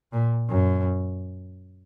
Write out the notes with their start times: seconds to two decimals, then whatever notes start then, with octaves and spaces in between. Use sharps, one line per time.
0.12 A#2
0.50 F#2